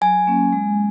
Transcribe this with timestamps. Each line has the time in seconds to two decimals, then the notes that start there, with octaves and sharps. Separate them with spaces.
0.01 F#3 G#5
0.27 A#3 C#4
0.53 G#3